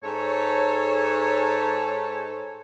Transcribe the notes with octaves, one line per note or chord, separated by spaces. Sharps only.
G#2 A4 C#5